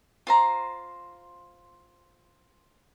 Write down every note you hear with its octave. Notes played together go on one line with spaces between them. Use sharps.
F4 C5 A#5